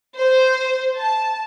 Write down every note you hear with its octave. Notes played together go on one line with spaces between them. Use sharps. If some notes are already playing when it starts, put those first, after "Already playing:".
C5
A5